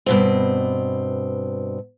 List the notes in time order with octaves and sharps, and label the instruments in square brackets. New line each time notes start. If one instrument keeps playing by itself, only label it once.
[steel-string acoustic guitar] G2 B2 C4